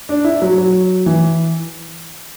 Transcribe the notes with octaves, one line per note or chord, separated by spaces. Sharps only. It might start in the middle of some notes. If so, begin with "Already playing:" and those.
D4
E4
F#3
F#3
E3